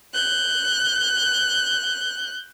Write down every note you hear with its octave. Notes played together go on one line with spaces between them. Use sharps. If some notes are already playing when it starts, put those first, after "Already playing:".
F#6 G6